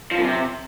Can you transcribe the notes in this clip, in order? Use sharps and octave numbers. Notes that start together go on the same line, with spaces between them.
F3
F#2
C3